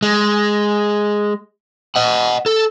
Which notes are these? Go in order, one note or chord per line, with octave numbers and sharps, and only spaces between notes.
G#3
D#5 F#5
A4